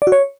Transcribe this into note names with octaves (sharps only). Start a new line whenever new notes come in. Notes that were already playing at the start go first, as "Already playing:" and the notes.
D5
F#4
C#5